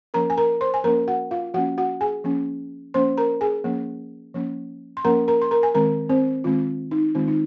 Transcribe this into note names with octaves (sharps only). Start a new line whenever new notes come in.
F3 A#3 C#4 A#4 A#5
G#5
A#4 A#5
C5 C6
G#5
F3 A#3 C#4 A#4 A#5
F#4 F#5
F4 F5
F3 A#3 C#4 F#4 F#5
F#4 F#5
G#4 G#5
F3 A#3 C#4
F3 A#3 C#4 C5 C6
A#4 A#5
G#4 G#5
F3 A#3 C#4
F3 A#3 C#4
C6
F3 A#3 C#4 A#4 A#5
A#4 A#5
C6
A#4 A#5
G#5
D#3 G#3 C4 A#4 A#5
C4 C5
D#3 G#3 C4 F4
D#4
D#3 G#3 C4 F4
D#4